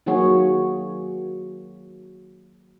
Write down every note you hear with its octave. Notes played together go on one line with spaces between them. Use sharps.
D#3 F#3 A#3 F#4 G#4 C#5